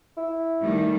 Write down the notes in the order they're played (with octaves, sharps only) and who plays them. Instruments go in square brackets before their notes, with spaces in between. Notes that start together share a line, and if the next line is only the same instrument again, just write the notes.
[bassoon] E4
[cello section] D#3 G3 A3